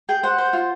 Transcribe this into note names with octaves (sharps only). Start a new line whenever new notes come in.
G#4 G5
C5 F#5
C5
F4